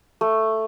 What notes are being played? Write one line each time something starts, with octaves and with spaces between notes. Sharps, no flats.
A3